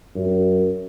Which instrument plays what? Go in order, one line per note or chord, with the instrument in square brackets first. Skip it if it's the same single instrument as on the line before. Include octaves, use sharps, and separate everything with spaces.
[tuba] F#2